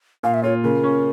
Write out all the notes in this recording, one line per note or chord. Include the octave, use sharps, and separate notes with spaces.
A#2 F5
E5
F4 C#5
C#3 A#4
C#4